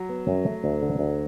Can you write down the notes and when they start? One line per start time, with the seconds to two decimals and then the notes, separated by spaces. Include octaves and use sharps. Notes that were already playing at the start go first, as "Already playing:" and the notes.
Already playing: F#3
0.09 B3
0.28 F#2
0.46 A3
0.64 D2
0.82 D3
0.99 D2